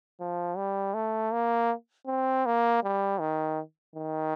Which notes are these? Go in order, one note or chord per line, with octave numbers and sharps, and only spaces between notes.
F3
G3
A3
A#3
C4
A#3
G3
D#3
D#3